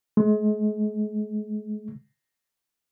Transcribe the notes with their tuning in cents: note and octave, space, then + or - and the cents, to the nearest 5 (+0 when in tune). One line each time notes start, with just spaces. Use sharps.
G#3 +35